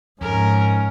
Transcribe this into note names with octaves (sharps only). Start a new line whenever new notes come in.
F2 G#2 C#4 A#4